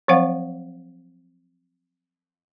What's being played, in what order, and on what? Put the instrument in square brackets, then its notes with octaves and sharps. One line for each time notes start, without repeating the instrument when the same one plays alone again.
[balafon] F3 F#3 C4 C5 F5 F#5